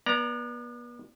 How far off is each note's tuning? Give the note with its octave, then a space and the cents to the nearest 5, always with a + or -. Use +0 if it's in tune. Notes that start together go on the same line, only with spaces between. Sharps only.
B3 -35 D5 +0 A#5 +5